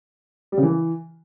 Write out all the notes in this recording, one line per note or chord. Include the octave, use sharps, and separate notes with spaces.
G3
C#3
E3